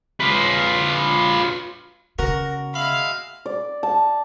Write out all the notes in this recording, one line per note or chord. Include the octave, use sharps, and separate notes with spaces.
F4 B4
C#3 F#4 A#4
G#3 E5 F5 B5
D5
A5